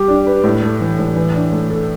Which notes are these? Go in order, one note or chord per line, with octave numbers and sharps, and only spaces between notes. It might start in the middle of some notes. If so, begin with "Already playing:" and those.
Already playing: G3 G4
D4
B4
A2
A3
E3
A2
E3
D4
A3
A4